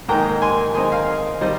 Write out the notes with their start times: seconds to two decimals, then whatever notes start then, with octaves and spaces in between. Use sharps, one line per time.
0.09 G#2 D#3 A#3 D#4 G5 A#5
0.42 G#5 C6
0.74 D#3 G#3 C4 D#4 G#5 C6
0.92 F5 G#5
1.41 D#3 G3 C4 C5 D#5